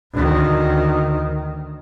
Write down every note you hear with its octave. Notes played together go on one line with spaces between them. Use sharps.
D2 D#3